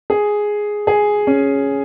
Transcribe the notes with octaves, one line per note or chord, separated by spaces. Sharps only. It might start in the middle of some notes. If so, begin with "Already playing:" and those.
G#4
G#4
C#4